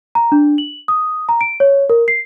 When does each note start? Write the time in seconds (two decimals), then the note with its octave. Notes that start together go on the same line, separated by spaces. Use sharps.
0.15 A#5
0.32 D4
0.58 F#7
0.88 D#6
1.29 A#5
1.41 D7
1.60 C#5
1.90 A#4
2.08 C7